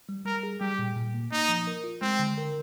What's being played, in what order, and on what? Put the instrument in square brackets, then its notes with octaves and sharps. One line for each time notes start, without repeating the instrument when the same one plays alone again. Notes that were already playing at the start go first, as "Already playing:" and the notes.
[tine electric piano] G3
[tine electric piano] G3 [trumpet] A#4
[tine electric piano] G#4
[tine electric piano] G3 [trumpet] G4
[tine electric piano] A#2
A#2
A#3
[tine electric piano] A#3 [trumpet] D#4
[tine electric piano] F3
A#4
F4
[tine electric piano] G#3 [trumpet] C4
[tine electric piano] D3
A#4